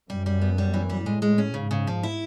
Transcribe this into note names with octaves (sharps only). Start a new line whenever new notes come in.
F#2 G3
G3
B3
G3
E3
G3
A2 G#3
G#3
C#4
G#2 C#3
C#3
F3
E4